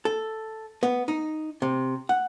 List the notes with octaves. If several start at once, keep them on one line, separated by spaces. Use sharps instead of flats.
A4
B3
D#4
C3
F#5